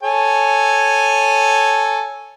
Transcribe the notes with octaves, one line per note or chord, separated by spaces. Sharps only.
A4 C#5 G#5